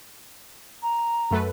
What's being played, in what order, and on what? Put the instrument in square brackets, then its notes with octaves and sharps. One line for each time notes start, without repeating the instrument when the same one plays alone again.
[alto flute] A#5
[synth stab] F#2 A3 B4